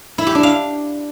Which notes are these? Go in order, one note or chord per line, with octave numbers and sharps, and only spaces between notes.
E4
G4
D4
F5